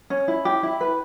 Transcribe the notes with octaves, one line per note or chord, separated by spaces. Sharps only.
C#4
E4
G4
E4
B4